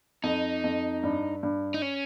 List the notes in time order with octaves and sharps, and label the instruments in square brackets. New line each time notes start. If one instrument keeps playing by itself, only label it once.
[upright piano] F2 [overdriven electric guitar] D#4
[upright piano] F2
G2
G2
[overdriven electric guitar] D#4
C#4